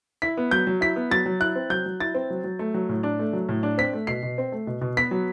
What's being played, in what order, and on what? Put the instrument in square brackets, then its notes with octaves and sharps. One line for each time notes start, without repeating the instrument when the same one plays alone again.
[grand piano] E4 B6
B3
F#3 G6
F#3
E4 B6
B3
F#3 A6
F#3
E4 F#6
C4
F#3 G6
F#3
E4 A6
C4
F#3
F#3
A3
F#3
A2
D4
A3
F#3
A2
D4
C4 B6
A3
B2 C7
B2
C4
A3
B2
B2
B3 B6
F#3